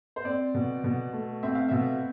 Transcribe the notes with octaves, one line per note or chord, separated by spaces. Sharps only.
C5
C4 D5
B2
B2
A3
C4 E5
F5
B2 E5